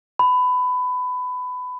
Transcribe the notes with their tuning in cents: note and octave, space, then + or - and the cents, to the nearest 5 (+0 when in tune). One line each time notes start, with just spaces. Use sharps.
B5 +20